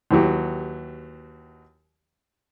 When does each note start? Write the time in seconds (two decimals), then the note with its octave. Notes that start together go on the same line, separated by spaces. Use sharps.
0.11 D#2 E3 F#3 G4